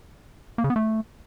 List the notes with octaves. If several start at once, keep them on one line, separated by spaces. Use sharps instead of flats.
A#3
C#3
B3
A3